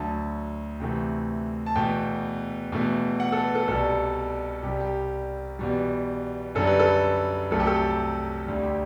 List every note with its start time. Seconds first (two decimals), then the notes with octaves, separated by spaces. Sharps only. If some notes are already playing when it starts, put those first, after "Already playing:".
Already playing: D2 D3 F#3 A5
0.80 D2 C3 E3 A3
1.66 A5
1.75 E2 B2 A3 G5
2.72 E2 B2 A3
3.20 F#5
3.32 A4
3.43 B4
3.55 A4
3.68 C2 B2 G3 A4
4.63 C2 C3 G3 G4
4.80 G4
5.59 E2 B2 G3
6.55 F#2 D3 G3 A4
6.67 B4
6.80 A4
7.51 C2 C3 F#3 A3 A4
7.60 G4
7.67 A4
8.47 D2 D3 G3
8.63 G4